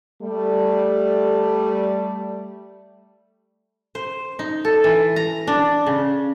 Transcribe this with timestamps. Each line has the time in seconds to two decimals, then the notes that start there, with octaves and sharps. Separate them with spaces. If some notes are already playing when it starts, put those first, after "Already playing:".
0.22 G3 A3
3.95 C5
4.39 D#4
4.65 A4
4.84 E3
5.16 A#5
5.47 D4
5.86 C#3